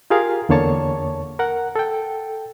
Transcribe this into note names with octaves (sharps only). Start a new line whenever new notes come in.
F4 G4 G#4 A#4 F5
E2 D3 A#3 C#5 A5 C#6
A#4 F#5
A4 G5